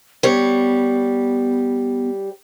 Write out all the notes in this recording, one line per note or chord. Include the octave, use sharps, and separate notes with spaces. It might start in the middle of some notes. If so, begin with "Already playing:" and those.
G3 B3 C#5